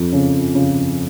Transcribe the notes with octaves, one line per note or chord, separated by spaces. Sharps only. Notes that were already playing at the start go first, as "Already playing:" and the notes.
Already playing: F2
C#3
C#3